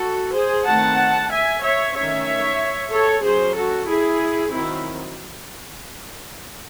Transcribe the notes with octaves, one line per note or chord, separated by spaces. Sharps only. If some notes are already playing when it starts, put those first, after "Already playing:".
Already playing: F#4 A4
G#4 C5
D#3 A3 C4 F#5 A5
E5 G#5
C#5 E5
D#3 A3 C#4 C#5 E5
A4 C#5
F#3 C#4 G#4 C5
F#4 A4
E4 G#4
D#3 F#3 C4 E4